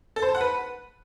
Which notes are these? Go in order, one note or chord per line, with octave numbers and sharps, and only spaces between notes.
A4
C5
A5
F#5
B4